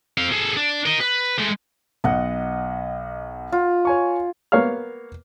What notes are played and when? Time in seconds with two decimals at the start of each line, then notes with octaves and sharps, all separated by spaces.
0.18 C4 F5
0.32 G#4 A4
0.56 D4
0.86 A#4 D#5
1.00 B4
1.38 G#3 A3
2.04 B1 D#5 F#5
3.52 F4
3.85 C#5 G#5 C#6
4.52 A#3 B3 C#5 F5 F6